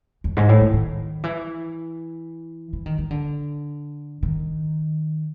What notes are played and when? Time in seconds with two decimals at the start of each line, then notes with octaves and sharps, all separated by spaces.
0.24 F2
0.37 G#2
0.49 A2
0.61 D#3
0.73 D#3
1.24 E3
2.73 E3
2.86 D#3
2.98 D#3
3.11 D3
4.23 D#3